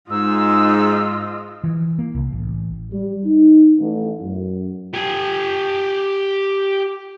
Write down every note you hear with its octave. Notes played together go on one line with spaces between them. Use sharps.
G#2 F4 D#5 E6
E3
A#3
C2
A1
G3
D#4
A1
F#2
G4 G#5